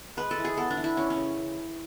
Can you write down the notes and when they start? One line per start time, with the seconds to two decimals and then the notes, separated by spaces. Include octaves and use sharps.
0.17 G#3 B4
0.31 A4
0.38 E3
0.45 G#4
0.57 B3 A4
0.70 D4
0.77 E3
0.84 E4
0.97 E3 C#4
1.10 C#4
1.16 C#3